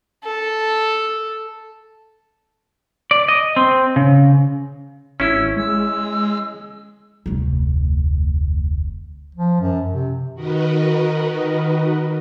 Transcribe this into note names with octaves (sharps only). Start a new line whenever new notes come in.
A4
D5
D#5
C4
C#3
G#1 C#4 E4 E6
G#3 E6
F1 D2
F3
F#2
C3
D#3 F#4 A#4 B4 D#5